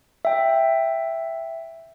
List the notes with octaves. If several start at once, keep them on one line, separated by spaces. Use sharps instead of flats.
E5 G5